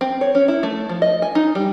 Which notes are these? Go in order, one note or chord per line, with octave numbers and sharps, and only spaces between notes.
C4
C#5
C#4
E4
A3
F3
D#5
G#5
D#4
G3